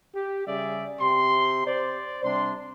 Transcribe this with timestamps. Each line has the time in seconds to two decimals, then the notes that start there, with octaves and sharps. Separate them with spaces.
0.15 G4
0.47 C#3 G3 G#4 D5 E5
1.01 C3 G4 C6
1.67 C5 D5
2.24 C3 G3 D4 C6